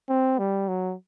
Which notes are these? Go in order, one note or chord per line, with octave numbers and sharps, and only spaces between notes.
C4
G3
F#3